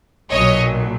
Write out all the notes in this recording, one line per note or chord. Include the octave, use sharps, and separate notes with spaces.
B1 A#2 F#3 C#5 D#5